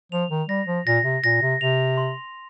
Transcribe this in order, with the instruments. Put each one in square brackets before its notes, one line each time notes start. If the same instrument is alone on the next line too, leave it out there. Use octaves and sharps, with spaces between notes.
[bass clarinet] F3 [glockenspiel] F7
[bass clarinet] D#3
[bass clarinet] G3 [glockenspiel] A#6
[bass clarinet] F3
[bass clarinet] A#2 [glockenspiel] A#6
[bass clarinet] C3
[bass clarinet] A#2 [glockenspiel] A#6
[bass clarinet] C3
[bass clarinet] C3 [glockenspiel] F7
[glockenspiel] C6